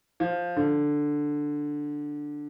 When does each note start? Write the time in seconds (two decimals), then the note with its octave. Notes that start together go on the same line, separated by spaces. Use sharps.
0.20 F3
0.56 D3